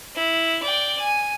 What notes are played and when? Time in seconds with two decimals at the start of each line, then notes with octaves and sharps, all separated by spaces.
0.15 E4
0.63 D5 G5
1.00 G#5